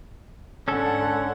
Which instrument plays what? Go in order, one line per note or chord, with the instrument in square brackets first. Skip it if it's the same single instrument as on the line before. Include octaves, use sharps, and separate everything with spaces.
[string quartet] G#2 D3 F#5 [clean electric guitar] C#4 A4